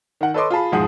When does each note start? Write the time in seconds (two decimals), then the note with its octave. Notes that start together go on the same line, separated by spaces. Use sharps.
0.21 D#3 F#5
0.34 A4 B4 C#5 D#5 C6 D6
0.50 F4 G#4 A5 B5
0.72 E1 G#2 F3 G#4 F#5 D#6